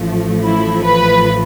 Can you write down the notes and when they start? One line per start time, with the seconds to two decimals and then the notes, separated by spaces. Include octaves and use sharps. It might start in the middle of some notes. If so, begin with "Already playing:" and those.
Already playing: A1 A2 F3 A3
0.43 E4
0.84 B4